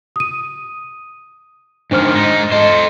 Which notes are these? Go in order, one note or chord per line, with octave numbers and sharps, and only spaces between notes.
D#6 D#7
G#2 D#3 F3 D4 C5 F6
G#2 D#4
A4 C5 D#5